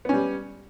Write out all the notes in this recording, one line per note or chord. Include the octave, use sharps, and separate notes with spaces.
G3 B3 C#4